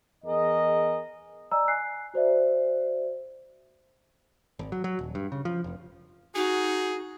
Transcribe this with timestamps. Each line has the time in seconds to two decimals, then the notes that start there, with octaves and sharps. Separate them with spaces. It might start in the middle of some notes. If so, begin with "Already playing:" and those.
0.25 E2 G#4 A#4 D#5
1.51 D5 D#5 G#5 A#5 E6
1.68 G#5 F#6 C7
2.14 F#4 C5 D5 E5
4.59 G#1
4.72 F#3
4.84 F#3
4.99 D#1
5.15 G2
5.32 C#3
5.45 F3
5.64 F1
6.35 D#4 F#4 G#4